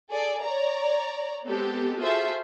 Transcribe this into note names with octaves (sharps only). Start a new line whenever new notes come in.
G#4 A4 D5
C#5 D5 A#5
G#3 B3 C4 G4 A4
F4 F#4 G#4 A4 C5 E5